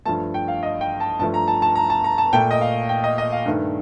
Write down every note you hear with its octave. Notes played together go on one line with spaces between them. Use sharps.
G2 F3 A3 A5
G5
F5
D#5
G5
A5
G2 F3 A3 A5
A#5
A5
A5
A#5
A5
A#5
A5
A#2 A3 G5
D#5
F5
G5
D#5
D#5
F5
G2 D#3 A3